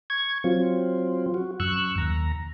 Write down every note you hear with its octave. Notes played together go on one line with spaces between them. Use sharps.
C#6 G#6
F#3 C4 F4
F#4
F#2 C#6 E6 F#6
D#2 A#5